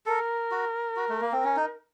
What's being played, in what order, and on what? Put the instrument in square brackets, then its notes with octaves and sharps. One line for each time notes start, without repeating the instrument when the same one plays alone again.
[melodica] A4 [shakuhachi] A#4
[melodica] F#4
F#4
A3
A#3
C4
C#4
D#4